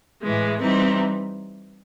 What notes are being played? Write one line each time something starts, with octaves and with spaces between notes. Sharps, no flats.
A2 E3 G#3
E3 G3 C4 D#4